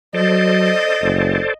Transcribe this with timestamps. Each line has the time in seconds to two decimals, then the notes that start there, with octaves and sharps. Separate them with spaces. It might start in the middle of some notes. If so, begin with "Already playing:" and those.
0.15 F#3 A4 C5 D5 D#5
1.02 F#1